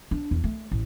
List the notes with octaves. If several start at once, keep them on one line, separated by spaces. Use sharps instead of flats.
D4
E2
A3
A1